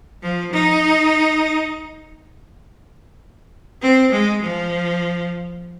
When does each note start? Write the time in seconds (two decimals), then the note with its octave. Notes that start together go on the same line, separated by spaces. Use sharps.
0.22 F3
0.53 D#4
3.82 C4
4.12 G#3
4.42 F3